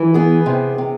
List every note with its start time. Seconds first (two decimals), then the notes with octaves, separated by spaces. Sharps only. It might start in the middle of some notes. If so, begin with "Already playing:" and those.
Already playing: E3
0.14 B3 G#4
0.46 C3
0.78 C3